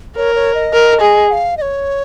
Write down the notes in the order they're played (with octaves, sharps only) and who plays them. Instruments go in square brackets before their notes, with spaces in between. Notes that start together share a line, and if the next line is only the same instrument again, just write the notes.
[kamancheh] A#4 [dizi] C#5
[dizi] C#5
D#5
[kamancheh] A#4
G#4
[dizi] F#5
F5
D#5
C#5